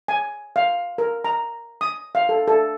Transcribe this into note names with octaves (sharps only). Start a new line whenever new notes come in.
G#5
F5
A#4
A#5
D#6
F5
A4
A4